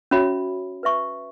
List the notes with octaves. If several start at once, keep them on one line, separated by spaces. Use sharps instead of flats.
C#4 F#4 C#5 E5 B5
B4 E5 C#6